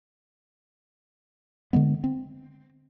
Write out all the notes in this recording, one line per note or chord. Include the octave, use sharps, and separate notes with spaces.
D3 D#3 G#3 B3
C4